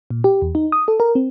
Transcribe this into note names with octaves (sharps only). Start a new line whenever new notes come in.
A#2
G4
E2
D#4
D#6
A4
A#4
C4